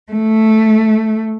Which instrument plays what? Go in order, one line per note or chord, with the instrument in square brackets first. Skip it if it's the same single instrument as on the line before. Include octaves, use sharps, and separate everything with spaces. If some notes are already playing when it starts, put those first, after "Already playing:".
[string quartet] A3